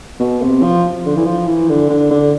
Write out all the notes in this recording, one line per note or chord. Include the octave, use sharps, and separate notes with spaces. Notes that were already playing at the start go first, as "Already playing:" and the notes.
B2
C3
F3
D3
E3
F3
E3
D3
D3
D3